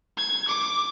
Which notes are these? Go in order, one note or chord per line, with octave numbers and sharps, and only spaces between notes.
G#6
D6